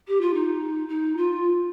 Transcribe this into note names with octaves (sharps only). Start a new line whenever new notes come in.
G4
F4
D#4
D#4
F4